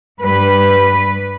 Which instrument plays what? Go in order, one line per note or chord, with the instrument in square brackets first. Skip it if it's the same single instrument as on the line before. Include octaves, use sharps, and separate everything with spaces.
[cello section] G2 G3 B4